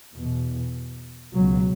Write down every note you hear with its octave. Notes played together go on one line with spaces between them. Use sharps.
E2 B2
C#2 B2 F#3